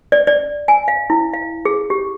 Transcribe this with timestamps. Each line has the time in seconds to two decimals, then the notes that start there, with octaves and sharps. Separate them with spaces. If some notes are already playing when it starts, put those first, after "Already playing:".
0.12 D5
0.27 D5
0.68 G#5
0.88 F5
1.10 E4
1.34 F5
1.65 G#4
1.90 G4